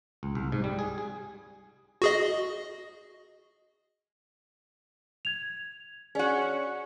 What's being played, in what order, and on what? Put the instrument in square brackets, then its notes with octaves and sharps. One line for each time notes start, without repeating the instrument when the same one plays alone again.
[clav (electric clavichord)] C#2
C2
G#2
G3
G#4
G#4
[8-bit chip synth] F#4 G#4 D#5
[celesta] G#6 F7
[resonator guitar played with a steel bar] C#4 F#4 [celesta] G#4 D5